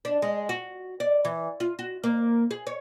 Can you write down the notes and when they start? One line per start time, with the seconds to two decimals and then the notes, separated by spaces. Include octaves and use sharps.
0.05 D4
0.22 G#3
0.49 F#4
1.00 D5
1.25 E3
1.60 F4
1.79 F#4
2.04 A#3
2.51 G#4
2.67 C#5